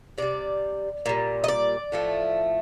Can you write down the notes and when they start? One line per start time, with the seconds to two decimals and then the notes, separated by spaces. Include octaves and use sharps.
0.18 C3 G3 D5
1.06 A#2 G3
1.44 D#5
1.48 D5
1.92 A2 F3 A3